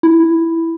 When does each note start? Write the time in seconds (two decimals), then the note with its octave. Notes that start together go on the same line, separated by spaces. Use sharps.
0.03 E4